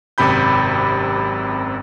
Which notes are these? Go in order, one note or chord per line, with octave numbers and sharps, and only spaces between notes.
G#1 F#2 C3 G4 B5 G6